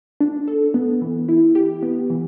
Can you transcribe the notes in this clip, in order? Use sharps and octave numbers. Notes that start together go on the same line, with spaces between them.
D4
A4
B3
E3
E4
G4
B3
E3